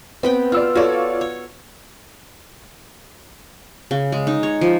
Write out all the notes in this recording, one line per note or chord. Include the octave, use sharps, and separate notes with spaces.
B3 C4 B4 G5
F4 D5 E6 F6
F4 F#4 A4 C#5 D5
C#5
C#3
G#3
D#4
C#5
F3